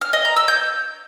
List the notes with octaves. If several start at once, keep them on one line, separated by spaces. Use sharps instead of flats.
F6
D#5
A#5
E6
G6